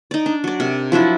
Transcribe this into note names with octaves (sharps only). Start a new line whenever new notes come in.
D#4 D5
D4
F#3 D5
C3 A#4
F3 F#3 D4 E4